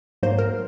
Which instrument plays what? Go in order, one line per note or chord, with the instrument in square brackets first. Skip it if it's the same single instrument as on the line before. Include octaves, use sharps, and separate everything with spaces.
[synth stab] G#2 F#3 A#3 C5
A#4